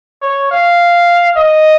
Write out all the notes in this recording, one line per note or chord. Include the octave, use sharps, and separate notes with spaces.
C#5
F5
D#5